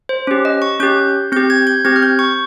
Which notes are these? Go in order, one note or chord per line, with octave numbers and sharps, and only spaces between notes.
C5
C#4 G4
D#5
C#6
C#4 G4 G6
C4 G4 G6
G#6
G6
C4 G4 G#6
F6
G6
C#6